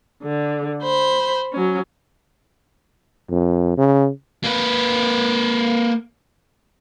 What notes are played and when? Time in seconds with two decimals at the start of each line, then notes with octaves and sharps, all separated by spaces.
0.23 D3
0.83 C5 B5
1.53 F#3 C#4
3.30 F2
3.77 C#3
4.44 A#3 B4